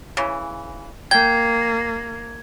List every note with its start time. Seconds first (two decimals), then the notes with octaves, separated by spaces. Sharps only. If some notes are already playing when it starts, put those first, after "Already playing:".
0.17 C#3 E3
1.11 A#3 G5 G#6